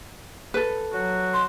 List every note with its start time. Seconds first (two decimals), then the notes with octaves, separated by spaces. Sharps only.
0.54 A4 B4
0.93 F#3 F#4
1.34 C6